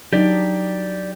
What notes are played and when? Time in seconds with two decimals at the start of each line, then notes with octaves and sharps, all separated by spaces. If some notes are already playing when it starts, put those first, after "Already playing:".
0.13 F#3 D4 D#4 G4 D5